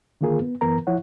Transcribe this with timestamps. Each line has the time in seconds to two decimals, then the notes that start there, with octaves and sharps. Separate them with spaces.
0.21 D3 D#3 A#3 F4 G#4 A#4
0.42 B3
0.61 F#2 E3 B3 A#4 A#5
0.87 F3 E4 C#5 F#5